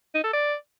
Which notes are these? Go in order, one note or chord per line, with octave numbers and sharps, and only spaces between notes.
D#4
A4
D5